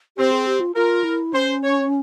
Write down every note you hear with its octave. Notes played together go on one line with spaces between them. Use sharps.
C4 G4
G#4
G4
F4
F4 A#4
E4
C#4 C5
C#5